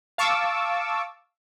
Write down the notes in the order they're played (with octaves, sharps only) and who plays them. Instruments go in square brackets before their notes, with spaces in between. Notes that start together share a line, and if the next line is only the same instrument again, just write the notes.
[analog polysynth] F5 A5 C#6 D6 E6